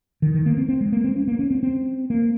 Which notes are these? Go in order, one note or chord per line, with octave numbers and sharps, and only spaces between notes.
D#3
D#3
A#3
C4
C4
G#3
A#3
C4
C#4
A#3
C#4
C4
C4
A#3